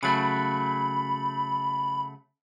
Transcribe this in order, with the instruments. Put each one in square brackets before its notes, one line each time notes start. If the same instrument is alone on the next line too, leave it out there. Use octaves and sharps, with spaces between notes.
[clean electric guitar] C#3 F#3 A3 [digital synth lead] B5